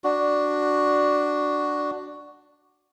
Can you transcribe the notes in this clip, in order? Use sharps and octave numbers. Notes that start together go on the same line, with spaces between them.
D4 F#4